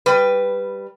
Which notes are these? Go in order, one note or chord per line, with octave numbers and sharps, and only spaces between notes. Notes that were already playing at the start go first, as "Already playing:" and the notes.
G3 B4